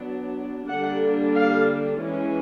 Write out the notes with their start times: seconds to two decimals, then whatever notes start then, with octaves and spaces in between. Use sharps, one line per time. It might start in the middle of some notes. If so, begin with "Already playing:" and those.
Already playing: F#3 B3 D4
0.69 D3 G3 A#3 D4 F#5
1.35 F5
2.02 E3 G#3 C#4